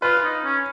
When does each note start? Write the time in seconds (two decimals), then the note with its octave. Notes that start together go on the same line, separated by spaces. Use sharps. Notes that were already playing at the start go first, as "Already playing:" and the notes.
0.02 F4 B4
0.24 D#4
0.44 C#4